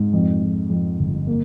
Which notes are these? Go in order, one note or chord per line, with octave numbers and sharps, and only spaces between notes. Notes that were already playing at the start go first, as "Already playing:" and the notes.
Already playing: G#2
F2
F2
F2
G1
A#3